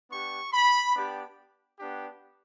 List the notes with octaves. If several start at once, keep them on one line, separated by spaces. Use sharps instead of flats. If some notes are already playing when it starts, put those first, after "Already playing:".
B3 D4 G4 C#6
B5
B3 D4 G4
B3 D4 G4